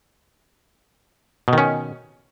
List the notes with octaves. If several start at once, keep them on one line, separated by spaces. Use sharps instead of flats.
B2 D#3 C#4